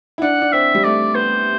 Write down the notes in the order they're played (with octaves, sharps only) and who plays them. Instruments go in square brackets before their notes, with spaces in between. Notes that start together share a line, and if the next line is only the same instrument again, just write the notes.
[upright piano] E4
[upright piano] D4 [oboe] F#5
[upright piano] D4
[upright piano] C4 [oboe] E5
[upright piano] G3
[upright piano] A3 [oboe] D5
[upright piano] B3 [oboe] C5